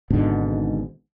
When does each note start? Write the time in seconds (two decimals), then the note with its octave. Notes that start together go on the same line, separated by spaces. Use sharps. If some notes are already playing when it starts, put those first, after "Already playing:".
0.10 G#1 G#2 B2 D3